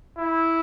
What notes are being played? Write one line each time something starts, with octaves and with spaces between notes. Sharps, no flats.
E4